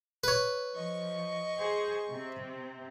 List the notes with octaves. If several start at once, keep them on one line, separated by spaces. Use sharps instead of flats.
B4 C#5
F3 D#5 C#6
G#4 C5
C3 C4